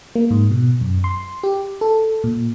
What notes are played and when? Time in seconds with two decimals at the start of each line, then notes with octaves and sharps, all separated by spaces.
0.15 A#3
0.31 G#2
0.50 B2
0.81 F#2
1.04 C6
1.43 G4
1.81 A4
2.24 A#2